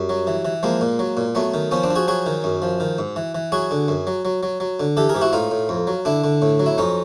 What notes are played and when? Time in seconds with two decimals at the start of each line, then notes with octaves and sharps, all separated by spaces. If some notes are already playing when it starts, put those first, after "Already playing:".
Already playing: F#2 G3
0.09 F#3
0.27 E3
0.45 E3
0.63 F3 G#3 A#3
0.81 A#2
0.99 F#3
1.17 A#2
1.35 F#3 A3 B3
1.54 D#3
1.71 F3 B3 C#4
1.83 C4 D4
1.90 F3
1.95 F#4 G#4
2.08 F#3 F#4 G#4
2.26 D#3
2.44 F#2
2.62 F3
2.80 D#3
2.98 G#2
3.16 E3
3.35 E3
3.52 F#3 F#4 G#4
3.71 D3
3.88 F#2
4.07 F#3
4.25 F#3
4.43 F#3
4.60 F#3
4.80 D3
4.97 E3 G4 A4
5.09 G#4 A#4
5.15 G#2 G4
5.21 E4 F#4
5.33 A2 D#4 F4
5.51 A2
5.69 F2
5.87 F#3
6.05 D3 D4 E4
6.24 D3
6.42 A2
6.60 F#3
6.66 E4
6.78 F2 C#4 D#4